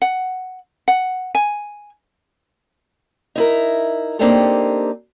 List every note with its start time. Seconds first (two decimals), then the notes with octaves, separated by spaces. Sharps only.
0.02 F#5
0.88 F#5
1.35 G#5
3.36 D#4 E4 A#4
4.19 A#3 C4 D4 D#4 G4 A4